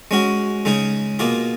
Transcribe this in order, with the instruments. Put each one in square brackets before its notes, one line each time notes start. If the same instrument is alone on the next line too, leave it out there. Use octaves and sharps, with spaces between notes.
[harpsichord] G#3 C#4 F#4
C#3 G#3 D#4 G#4
B2 A#3 F4 G#4